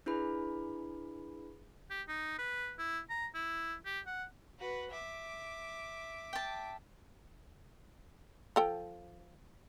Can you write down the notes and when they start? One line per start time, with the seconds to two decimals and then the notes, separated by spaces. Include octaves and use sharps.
0.06 D4 E4 G#4 B4 B5
1.90 G4
2.08 D#4
2.39 B4
2.79 E4
3.10 A#5
3.35 E4
3.86 G4
4.07 F#5
4.59 F#4 B4
4.91 E5 D6
6.33 G5 A5
8.56 F3 A4 G5